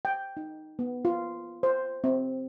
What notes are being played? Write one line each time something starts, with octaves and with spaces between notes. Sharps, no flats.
G5
D#4
B3
F4
C5
C4